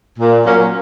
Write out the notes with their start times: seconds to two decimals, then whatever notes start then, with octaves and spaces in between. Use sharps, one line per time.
0.18 A#2
0.45 F#3 A#3 C#4